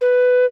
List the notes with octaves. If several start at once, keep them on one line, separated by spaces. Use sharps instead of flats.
B4